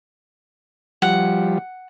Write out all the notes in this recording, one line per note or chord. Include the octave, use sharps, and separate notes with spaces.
F3 G3 F#5